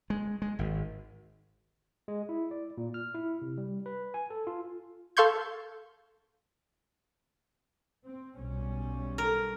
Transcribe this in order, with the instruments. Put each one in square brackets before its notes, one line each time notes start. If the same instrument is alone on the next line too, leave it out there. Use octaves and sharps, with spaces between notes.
[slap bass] G#3
G#3
G#1
[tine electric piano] G#3
E4
D5
A#2
F6
E4
C3
G3
B4
G#5
A4
F4
[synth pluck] A4 F5 C6 C#6 G6 G#6
[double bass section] C4
B1 G3 C#4
[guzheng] A#4